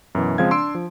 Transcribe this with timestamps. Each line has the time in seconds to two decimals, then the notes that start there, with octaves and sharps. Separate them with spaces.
0.15 F#2 B2 E3
0.38 C#3 F3 G#3 C4 F5 G#6
0.51 D4 C6 E6 D7
0.75 F3